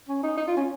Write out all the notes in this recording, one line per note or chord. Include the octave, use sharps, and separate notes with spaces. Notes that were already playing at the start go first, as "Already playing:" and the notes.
C#4
D#4
D#4
F4
C#4